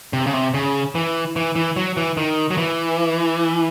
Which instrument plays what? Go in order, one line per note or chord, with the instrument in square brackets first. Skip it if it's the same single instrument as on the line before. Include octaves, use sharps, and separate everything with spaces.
[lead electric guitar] C3
C#3
C3
C#3
E3
E3
E3
F#3
E3
D#3
F#3
E3